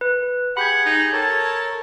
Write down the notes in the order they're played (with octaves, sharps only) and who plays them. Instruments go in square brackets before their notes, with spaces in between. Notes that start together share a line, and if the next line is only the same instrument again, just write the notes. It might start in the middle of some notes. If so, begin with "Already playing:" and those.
[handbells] B4
[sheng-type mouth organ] G4 G#4 [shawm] F#5 [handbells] B5 G6 G#6
[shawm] D#4
[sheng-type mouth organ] A4 A#4 C#5 [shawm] A5